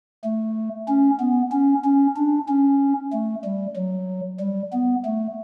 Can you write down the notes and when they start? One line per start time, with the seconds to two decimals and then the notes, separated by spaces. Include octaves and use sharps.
0.24 A3
0.88 C#4
1.20 B3
1.52 C#4
1.85 C#4
2.16 D4
2.49 C#4
3.13 A3
3.45 G3
3.76 F#3
4.40 G3
4.73 B3
5.05 A3